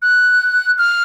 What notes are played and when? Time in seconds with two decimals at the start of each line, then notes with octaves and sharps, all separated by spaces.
0.02 F#6
0.78 F6